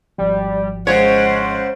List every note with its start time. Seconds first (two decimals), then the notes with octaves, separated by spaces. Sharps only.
0.18 G#1 F3 G3
0.87 C#3 G#3 C5 C#5 F#5